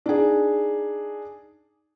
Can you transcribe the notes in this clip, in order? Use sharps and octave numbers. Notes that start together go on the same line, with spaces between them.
D4 D#4 G#4